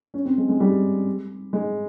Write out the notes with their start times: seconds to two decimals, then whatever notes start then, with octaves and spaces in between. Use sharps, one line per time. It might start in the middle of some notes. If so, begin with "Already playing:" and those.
0.14 C#4
0.25 C4
0.38 G#3
0.49 G#3
0.60 G3
1.53 G#3